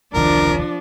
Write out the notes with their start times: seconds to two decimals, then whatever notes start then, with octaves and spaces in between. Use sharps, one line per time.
0.14 E1 C2 D#3 F3 D4 A#4